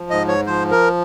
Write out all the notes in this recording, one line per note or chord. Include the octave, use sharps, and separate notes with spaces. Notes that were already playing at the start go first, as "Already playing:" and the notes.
Already playing: F3
G#2 D#5
C#5
F3 C5
A#4